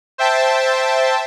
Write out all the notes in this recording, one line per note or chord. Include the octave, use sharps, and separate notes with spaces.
C5 E5 G5 A5